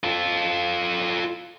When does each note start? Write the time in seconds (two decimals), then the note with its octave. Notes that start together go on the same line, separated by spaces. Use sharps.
0.04 F4 A4